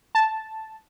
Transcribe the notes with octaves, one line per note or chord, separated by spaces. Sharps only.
A5